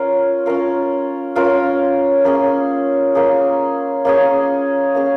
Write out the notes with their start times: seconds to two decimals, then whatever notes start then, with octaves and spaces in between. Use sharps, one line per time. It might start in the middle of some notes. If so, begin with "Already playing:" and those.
Already playing: C#4 F4 A#4 F5
0.46 C#4 F4 A#4 F5
1.36 C#4 F4 A#4 F5
2.25 A#3 C#4 G#4
3.15 A#3 C#4 G#4
4.05 A#3 C#4 G#4
4.95 A#3 C#4 G#4